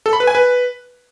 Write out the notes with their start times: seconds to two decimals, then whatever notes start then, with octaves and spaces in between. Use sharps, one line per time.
0.06 A4
0.13 B5
0.20 B4
0.27 G#5
0.35 B4